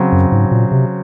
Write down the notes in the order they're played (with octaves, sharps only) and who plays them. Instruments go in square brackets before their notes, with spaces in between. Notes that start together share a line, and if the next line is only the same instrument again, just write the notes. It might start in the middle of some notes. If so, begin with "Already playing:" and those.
Already playing: [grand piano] C#3 F#3 C4
[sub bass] F#2
G#2
A#2
C3